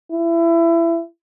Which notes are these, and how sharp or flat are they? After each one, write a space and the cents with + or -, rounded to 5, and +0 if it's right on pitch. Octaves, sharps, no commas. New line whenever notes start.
E4 +25